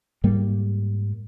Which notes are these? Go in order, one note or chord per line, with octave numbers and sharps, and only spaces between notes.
G#2 G3 A#3